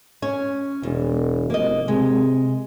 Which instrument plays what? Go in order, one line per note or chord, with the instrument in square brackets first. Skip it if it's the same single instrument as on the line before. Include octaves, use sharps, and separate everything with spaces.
[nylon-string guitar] C#4 C#5
[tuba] E1 [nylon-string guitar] E2
[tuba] F1 [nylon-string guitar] A#3 D#5
[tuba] C3 [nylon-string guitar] G#3